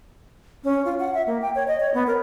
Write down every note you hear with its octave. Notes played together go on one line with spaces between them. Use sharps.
C#4
F4
F#5
E5
A#3
G5
C#5
D#5
C#5
B3
A#4